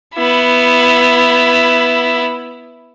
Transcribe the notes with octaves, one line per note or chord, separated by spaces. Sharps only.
B3 E4